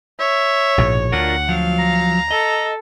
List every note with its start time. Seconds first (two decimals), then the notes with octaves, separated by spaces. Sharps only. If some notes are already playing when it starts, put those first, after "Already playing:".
0.20 C#5 E5
0.78 A#1 G#2 B2
1.12 D2 D4 F4 A#4 F#5
1.49 F3 F#3 F5
1.79 A#5
2.31 A4 D#5